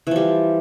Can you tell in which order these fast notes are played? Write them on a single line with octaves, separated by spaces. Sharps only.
E3 F3 G3